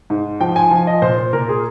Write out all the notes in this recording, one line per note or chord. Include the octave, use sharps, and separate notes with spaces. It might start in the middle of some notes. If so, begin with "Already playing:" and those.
G#2
F3 G5
G#5
F3
D#5
A#2 C5
C5
A#2 A#4
G#4